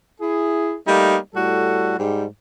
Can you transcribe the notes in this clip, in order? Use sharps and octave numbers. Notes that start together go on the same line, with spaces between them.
E4 G#4
G3 A3 A#3 D#4
A2 G3 F#4 A4
G#2 G3